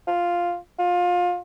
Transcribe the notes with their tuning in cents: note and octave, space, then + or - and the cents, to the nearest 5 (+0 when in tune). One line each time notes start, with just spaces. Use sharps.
F4 +0
F4 +25